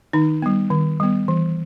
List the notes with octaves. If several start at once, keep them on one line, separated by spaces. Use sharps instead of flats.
D#3 D#4
G3 B3
D#3
G3 B3
E3